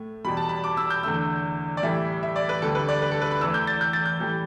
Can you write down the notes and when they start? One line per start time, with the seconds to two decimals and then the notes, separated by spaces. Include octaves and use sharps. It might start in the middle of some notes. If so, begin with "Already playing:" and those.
Already playing: A2 A3
0.25 E2 B2 G3 B5
0.37 A5
0.49 B5
0.64 D6
0.77 E6
0.90 G6
1.03 E2 D3 A3 E6
1.77 D5
1.83 A2 E3 G3 E5
2.23 E5
2.36 D5
2.49 B4
2.62 D2 D3 G3 A4
2.75 B4
2.88 D5
3.02 B4
3.12 A4
3.21 B4
3.31 B5
3.41 E2 E3 A3 E6
3.54 G6
3.67 A6
3.81 G6
3.93 A6
4.06 G6
4.20 A2 E3 G3